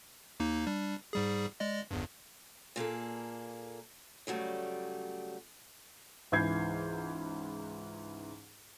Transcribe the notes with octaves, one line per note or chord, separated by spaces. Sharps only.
D#2 A#3 D#4
G3 D4
G#2 G3 G#4
G#3 D5 D#5
G1 E2 G2
A#2 A#3 G#4 A4
C#3 F#3 G3 A3
C#2 G#2 E3 G6 G#6 C7